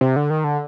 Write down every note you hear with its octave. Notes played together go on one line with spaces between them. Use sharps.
C3
D3
D#3
D3